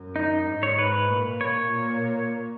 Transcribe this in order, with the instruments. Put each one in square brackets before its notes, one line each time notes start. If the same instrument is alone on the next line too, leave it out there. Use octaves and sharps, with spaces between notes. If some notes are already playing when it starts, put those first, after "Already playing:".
Already playing: [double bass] F#2
[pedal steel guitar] D#4
[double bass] G#2
[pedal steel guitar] C#5
B4
[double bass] A#2
[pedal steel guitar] C#5
[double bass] A#2